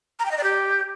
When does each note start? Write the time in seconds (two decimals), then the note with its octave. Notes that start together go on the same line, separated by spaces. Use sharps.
0.19 A#5
0.25 G5
0.31 D#5
0.37 D5
0.43 G4